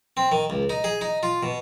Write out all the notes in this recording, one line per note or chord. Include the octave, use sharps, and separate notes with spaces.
C4
D#3
C#2
D#4
G#4
D#4
F4
B2